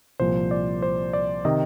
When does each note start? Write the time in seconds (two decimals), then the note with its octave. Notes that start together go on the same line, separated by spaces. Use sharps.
0.20 C2 A#2 F3 C5
0.51 D5
0.82 C5
1.13 D5
1.45 C3 D#3 D#5